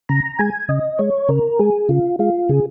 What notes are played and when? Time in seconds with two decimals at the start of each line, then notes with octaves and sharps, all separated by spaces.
0.09 C#3 A#5
0.39 G#3 G#5
0.69 C#3 D#5
0.99 G#3 C#5
1.29 C#3 A#4
1.59 G#3 G#4
1.89 C#3 F4
2.19 G#3 F4
2.49 C#3 G#4